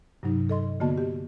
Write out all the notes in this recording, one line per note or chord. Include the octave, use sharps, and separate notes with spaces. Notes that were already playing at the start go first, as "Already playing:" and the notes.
G2 C3 F#3 D#4
A4 D#5 C6
D3 A#3 B3 F#4 D#5 A5
G4